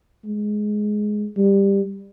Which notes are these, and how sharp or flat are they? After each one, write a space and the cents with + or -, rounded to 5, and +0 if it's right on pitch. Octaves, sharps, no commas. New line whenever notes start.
G#3 +10
G3 +15